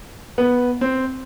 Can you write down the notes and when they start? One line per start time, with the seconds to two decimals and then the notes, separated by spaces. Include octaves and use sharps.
0.38 B3
0.81 C4